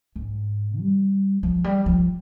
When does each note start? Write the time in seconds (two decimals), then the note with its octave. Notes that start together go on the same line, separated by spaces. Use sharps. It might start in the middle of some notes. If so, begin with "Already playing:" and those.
0.16 G#2
0.79 G3
1.43 F3
1.64 G3
1.86 F3